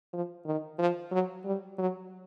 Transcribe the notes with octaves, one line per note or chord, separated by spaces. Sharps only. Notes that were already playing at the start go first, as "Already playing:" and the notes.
F3
D#3
F3
F#3
G3
F#3